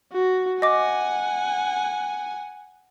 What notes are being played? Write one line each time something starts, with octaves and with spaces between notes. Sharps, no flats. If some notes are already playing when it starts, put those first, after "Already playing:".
F#4
D#5 F#5 G#5 D6